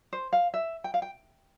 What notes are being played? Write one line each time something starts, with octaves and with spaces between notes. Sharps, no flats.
C5
F5
E5
G5
F5
G5